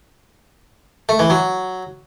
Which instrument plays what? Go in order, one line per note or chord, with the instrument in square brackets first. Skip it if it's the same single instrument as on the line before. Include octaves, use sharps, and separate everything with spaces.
[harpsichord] A3
E3
F#3